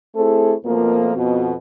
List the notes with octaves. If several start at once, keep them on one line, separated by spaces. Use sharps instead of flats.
A3 C4 E4 G#4 A4
F2 B2 F3 A3 A#3
F2 B2